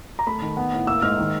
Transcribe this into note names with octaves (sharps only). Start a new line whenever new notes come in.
A#5
A3 B5
D#3
B3
A2
A#3 E6
G#2 F6
D#3